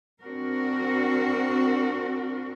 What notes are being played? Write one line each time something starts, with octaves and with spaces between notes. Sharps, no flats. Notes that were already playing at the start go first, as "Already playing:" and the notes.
C4 D4 F#4 A#4